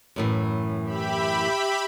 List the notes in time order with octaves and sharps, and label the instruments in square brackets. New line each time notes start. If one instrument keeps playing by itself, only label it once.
[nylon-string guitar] F#2 A2 E3
[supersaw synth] G4 E5 B5